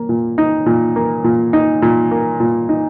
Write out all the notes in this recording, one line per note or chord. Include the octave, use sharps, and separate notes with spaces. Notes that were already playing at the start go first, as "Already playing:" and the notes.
Already playing: A#3
A#2
D#4
A#2
A#3
A#2
D#4
A#2
A#3
A#2
D#4